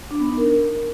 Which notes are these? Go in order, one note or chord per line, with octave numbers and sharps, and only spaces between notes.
D4
B3
D#4
A#4